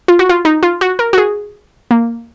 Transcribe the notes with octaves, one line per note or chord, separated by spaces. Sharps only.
F4
F#4
F4
D#4
F4
F#4
A#4
F#4
G#4
A#3